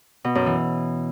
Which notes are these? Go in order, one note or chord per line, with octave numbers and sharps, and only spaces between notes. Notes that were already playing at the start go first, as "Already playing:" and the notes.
B2
F#2
E3